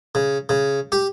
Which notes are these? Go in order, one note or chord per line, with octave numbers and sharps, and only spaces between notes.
C#3
C#3
G4